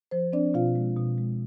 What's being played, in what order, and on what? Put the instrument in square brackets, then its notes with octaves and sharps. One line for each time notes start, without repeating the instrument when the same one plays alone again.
[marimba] F3 C5
C4 D4 D5
B2 F4 F5
G#3
B2
G#3